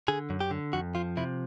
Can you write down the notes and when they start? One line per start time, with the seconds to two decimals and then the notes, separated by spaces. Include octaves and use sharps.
0.08 D3 G#4
0.30 F#2
0.40 G4
0.51 D3
0.73 F2 F#4
0.95 F3 F4
1.17 C3 E4